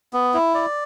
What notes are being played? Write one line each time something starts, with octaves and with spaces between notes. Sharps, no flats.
B3
E4
D5